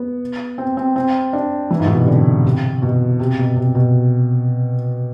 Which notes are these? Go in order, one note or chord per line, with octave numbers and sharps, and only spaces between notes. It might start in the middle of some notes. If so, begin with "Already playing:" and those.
Already playing: B3
C4
C4
C4
D4
E3
G#2
A2
B2
C3
D3
C3
B2
C3
B2
C3
B2